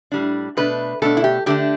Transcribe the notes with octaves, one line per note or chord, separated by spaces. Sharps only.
A2 G3 D4
B2 A3 D4 B4
B2 A3 D4 A4
E4
G4
D3 A3 D4 G4